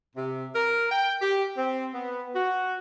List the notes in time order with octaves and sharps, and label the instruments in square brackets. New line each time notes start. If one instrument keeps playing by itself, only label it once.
[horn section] C3
A#4
G5
G4
C4
B3
F#4